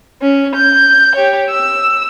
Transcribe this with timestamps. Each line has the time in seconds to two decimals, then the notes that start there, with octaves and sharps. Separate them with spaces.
0.22 C#4
0.55 G6
1.16 G4 C#5
1.50 E6